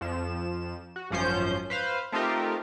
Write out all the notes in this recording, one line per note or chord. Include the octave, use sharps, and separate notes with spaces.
F2 F3 E7
F#4
G#1 F#2 F3 C#4 C5 G6
B4 C5 F5
A3 C4 D#4 F4 G4 A#4